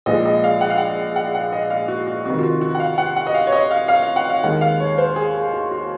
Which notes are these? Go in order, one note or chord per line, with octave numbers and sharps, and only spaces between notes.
A#1 A#2 F3 G#3 D#5
D#5
F5
F#5
F5
F#5
F#5
F#5
D#5
F5
F#4
F#4
F2 C3 D#3 F#4
F4
F#4
F#4
F#5
F5
F#5
F#5
D#5
F5
C#5
D#5
F5
F5
F5
F#5
F5
D#2 D#3 G#3 F#5
F5
C#5
C5
G#4
G#4
F#4
F#4